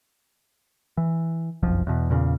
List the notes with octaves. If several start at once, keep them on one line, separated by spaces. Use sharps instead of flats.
E3
F#1 B1 F2 F3
E2 B2
E2 A#2 C#3